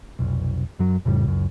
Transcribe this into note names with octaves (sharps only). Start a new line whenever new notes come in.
F1 B1
F#2 F#3
F2 A2 C#3 G3
C#2 F#2